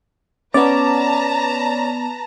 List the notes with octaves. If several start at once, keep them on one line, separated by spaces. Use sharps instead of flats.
B3 C#4 B4 D5 A5 A#5